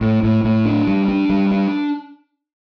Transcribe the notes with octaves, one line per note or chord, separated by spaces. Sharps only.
A2
A2
A2
D4
G3
D4
G3
D4